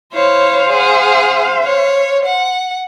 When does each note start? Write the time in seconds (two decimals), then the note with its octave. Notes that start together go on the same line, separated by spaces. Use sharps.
0.13 E4 C5 C#5 F5
0.69 G#4 F#5
1.63 C#5
2.25 F#5